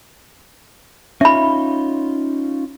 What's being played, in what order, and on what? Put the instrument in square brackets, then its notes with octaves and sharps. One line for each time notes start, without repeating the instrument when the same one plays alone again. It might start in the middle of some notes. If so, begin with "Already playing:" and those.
[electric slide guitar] C#4 D#4 F4 [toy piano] E5 B5